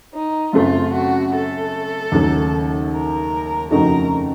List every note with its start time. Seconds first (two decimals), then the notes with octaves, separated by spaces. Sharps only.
0.14 D#4
0.53 F#2 C#3 A3 C4 F4
0.93 F#4
1.33 A4
2.12 D#2 C#3 F#3 A3
2.91 A#4
3.71 F2 C#3 A3 D#4 F#4 A#4